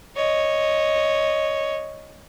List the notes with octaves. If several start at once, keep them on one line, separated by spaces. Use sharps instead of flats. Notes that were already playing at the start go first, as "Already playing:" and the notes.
C#5 D#5